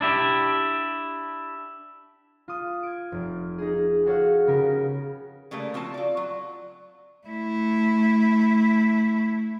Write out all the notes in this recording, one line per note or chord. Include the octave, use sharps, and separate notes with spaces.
D4 E4 G4
F4 D#6
G#6 D7
F1
D#4 G#4
F#4 G#4 A4 C#5 F5 F#5
C#3 B3 C#4 G4 A#4
C#3 G3 A3 A#3
F3 C4 F#4 A5
F4 D5
F#3
A3 E4